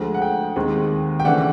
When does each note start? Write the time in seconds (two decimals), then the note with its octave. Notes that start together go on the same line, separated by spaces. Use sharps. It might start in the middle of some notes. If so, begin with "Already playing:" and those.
Already playing: D2 D3 F3 G#3
0.14 F#5
0.22 G5
0.56 D#2 D#3 G#3 C4
1.20 G5
1.25 C#3 E3 A3 D4 F#5